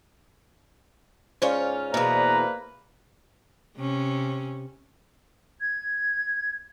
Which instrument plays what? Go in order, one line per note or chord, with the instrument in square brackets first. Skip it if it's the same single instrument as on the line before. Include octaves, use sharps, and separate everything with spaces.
[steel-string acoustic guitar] G#2 C#4 F4 [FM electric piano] C5 D5 F5
[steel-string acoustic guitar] E2 B2 [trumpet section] A#3 B4 [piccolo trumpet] A#5
[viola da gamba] C3 C#4
[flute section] G#6